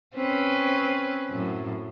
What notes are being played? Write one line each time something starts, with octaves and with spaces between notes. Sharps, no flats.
C4 C#4 B4
F#2 A2